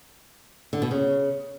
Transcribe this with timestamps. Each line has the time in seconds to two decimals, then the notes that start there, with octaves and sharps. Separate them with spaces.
0.73 D3
0.82 B2
0.91 C#3